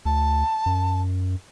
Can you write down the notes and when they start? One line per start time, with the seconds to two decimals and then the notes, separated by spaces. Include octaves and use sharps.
0.05 D2 A5
0.66 F#2